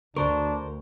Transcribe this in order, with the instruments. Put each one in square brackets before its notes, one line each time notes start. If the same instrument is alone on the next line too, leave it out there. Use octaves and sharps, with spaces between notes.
[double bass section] D2 [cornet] D4 [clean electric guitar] A#4 C5 [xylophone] C#6